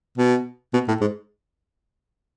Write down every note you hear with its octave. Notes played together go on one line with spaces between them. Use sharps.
B2
B2
A2
G#2